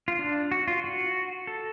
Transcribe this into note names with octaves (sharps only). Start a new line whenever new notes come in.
F4
D4
F#4
F4
F#4
A4